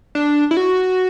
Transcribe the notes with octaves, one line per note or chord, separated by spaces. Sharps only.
D4
E4
F#4